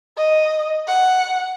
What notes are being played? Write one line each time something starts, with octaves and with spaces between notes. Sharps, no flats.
D#5
F#5